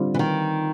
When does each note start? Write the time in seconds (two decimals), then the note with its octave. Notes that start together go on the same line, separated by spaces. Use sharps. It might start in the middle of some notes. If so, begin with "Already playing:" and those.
Already playing: D3 G3 C4 F4
0.14 E3
0.19 D#3